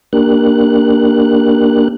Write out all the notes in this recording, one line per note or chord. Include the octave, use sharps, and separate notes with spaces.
A#3 D4 G4 A#4 F#6